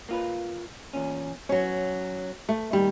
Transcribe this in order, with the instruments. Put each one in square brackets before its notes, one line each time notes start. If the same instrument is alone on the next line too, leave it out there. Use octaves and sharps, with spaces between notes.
[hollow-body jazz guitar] A#3 F4 B4
E2 A#2 C#4
[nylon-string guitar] F#3 C#4 [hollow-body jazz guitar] C#5
[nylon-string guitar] A3
[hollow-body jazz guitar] A#2 D#3 [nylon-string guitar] G3